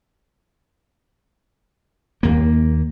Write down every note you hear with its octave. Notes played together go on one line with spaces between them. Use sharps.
D#2 A#3